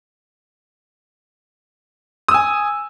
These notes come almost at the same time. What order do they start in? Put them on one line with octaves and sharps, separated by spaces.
D#6 E6 G#5